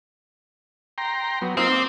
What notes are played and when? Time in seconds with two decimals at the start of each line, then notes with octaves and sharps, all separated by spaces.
0.98 G5 A#5 C6
1.42 F#3 B3
1.57 A#3 C4 D#4 F4
1.72 D6